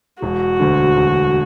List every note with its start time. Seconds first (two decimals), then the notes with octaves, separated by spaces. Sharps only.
0.22 E1 F#4
0.60 D2 D3
0.97 E1